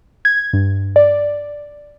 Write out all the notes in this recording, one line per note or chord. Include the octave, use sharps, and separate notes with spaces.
G#6
G2
D5